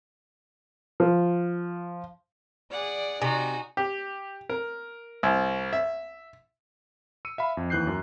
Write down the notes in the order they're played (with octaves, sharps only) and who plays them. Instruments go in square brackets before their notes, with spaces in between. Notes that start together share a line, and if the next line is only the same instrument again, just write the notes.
[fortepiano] F3
[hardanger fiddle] G#4 F#5 [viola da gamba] D5
[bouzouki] C3 [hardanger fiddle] D#4 F#4 [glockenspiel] G#5
[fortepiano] G4
A#4
C2
E5
[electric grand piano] E6 C#7 D#7
E5 F5 B5
F2
D#2 E3 F#6 G6 C7
F#2